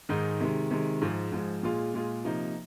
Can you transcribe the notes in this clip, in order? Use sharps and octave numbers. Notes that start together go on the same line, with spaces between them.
G#2 D#3 G#3 D#4
C3 D#3 G#3
C3 D#3 G#3
G#2 F3 G#3
G#2 F3 G#3
A#2 G#3 F4 G#4
A#2 G#3 F4 G#4
C3 F3 A#3 D#4